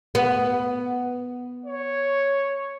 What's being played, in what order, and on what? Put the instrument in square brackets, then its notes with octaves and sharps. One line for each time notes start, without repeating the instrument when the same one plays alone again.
[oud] B3
[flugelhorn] C#5